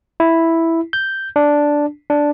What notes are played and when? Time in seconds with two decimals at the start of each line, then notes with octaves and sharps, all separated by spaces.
0.20 E4
0.93 G6
1.36 D4
2.10 D4